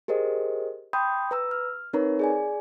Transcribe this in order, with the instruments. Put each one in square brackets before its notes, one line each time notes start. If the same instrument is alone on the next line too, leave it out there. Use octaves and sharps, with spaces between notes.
[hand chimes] G4 G#4 A#4 C5 D#5
G5 B5 C6 D#6 G6
B4 A#5 E6
F6
C4 D#4 A#4 B4 C#5 A#5
G#4 D5 G#5